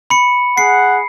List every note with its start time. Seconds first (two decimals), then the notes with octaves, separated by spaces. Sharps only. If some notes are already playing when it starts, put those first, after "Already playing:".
0.10 B5 C#7
0.58 G#4 F#5 C7